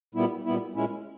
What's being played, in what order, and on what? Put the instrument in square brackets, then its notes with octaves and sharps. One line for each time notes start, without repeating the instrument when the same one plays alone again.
[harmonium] A#2 G3 B3 E4
A#2 G3 B3 E4
A#2 G#3 C#4 E4